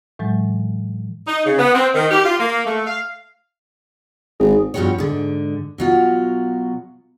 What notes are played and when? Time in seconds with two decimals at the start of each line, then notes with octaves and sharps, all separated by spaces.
0.19 A2 E3 F#3 G#3
1.28 D#4
1.45 C#3
1.59 B3
1.75 C4
1.95 D#3
2.11 G4
2.25 F4
2.40 A#3
2.66 A3
2.86 F5
4.40 G#1 G#4
4.74 E2 G2 F3 F#4 G4 C#5
4.98 G#2 D3
5.78 B2 F#3 F4